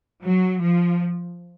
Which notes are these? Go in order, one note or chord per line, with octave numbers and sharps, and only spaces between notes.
F#3
F3